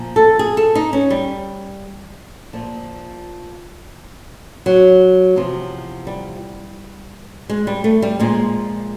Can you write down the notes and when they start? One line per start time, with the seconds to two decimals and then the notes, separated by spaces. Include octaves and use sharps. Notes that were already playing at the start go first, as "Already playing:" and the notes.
Already playing: A#2 F3
0.16 A4
0.39 G#4
0.57 A4
0.75 D#4
0.93 C#4
1.10 G3
2.53 A#2 F3
4.66 F#3
5.36 E2 C3 F3
6.07 G3
7.50 G#3
7.67 G3
7.84 A3
8.02 G3
8.20 A#2 F3 G#3